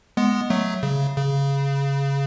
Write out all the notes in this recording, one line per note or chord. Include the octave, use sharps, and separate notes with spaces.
G#3 B3
F#3 A3
C#3
C#3